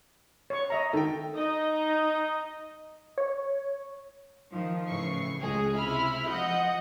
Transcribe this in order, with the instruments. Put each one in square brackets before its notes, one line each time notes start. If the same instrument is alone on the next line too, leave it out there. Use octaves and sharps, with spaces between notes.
[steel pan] C#5 C#6
D#5 E5 A#5
[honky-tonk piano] D#3 G5 [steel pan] A4
[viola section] D#4 D#5
[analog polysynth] C#5
[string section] D#3 F3
A2 C#3 E3 C#6 C7
C#2 G#3 G#4
C3 E4 B5 F6
F3 D#5 F#5 G6